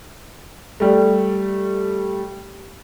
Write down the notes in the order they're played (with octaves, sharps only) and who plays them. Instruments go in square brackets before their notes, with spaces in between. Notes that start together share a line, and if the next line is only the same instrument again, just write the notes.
[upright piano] G3 A3